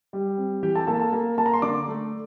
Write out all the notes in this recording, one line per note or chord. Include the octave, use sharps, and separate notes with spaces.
G3
C4
E3 G4 G5
A4 A5
A#3 A4 A5
A4 A5
A#3
A#3 A5
A#5
C6
D3 D5 D6
A3